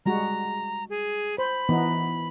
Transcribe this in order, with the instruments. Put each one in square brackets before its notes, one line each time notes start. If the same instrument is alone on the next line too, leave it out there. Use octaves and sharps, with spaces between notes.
[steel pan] G3 G#3 F#4 [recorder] A#5
[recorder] G#4
[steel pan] C5 [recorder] B5
[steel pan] E3 B3 D#4